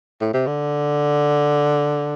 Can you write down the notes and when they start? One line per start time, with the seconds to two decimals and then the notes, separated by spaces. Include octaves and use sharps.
0.21 A2
0.34 C3
0.47 D3